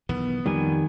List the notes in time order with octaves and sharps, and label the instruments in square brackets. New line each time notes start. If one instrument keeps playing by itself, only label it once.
[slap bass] B1 E2 D#3 [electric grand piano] B3
[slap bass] F2 [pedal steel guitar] D#3 G#5 [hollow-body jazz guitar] G3